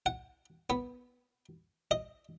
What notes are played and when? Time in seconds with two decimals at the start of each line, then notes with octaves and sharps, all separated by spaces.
0.06 F#5
0.70 B3
1.91 D#5